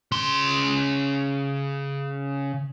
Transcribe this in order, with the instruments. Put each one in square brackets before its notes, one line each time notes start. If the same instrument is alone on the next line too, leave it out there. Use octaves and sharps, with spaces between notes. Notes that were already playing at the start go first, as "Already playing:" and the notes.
[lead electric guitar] C#3 C6